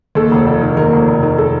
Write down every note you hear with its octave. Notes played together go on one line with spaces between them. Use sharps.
D#2 A4
F1
F1
D#3
D#2 A#4
F1
F1
D#3
A4